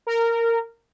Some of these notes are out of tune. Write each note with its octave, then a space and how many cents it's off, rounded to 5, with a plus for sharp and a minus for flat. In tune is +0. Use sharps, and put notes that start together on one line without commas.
A#4 -15